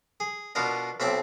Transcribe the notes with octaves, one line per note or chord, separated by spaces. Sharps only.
G#4
B2 B3 D4 F4 A#4 D#5
B1 C4 E5 G5 A5 D6